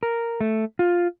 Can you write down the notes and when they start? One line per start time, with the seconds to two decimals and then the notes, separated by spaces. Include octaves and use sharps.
0.03 A#4
0.41 A3
0.79 F4